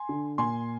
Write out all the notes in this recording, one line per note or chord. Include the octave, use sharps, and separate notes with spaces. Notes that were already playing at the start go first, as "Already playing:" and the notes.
Already playing: G#5 C6
D3
A#2 G#5 C6